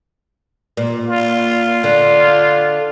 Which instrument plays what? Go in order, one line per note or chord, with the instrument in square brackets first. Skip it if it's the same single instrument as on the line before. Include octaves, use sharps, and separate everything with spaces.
[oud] A#2
[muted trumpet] F4
[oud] D3